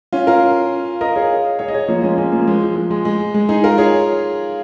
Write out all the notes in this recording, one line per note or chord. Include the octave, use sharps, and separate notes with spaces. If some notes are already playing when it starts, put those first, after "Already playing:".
C#4 F4
F4 A#4
A#4 D#5
G#4 C#5
G#4 C#5
D#5
G#4 C#5
F3 A#3
G#3 C#4
G#3 C#4
F3 A#3
G#3
F3
G#3
G#3
G#3
G#3
D#4 G#4
F4 A#4
G#4 C#5